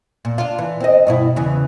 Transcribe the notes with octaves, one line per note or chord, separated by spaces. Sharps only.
A#2
D4 F4
E3
C4 D#5
G2 B2 E4
E2 C#3 E3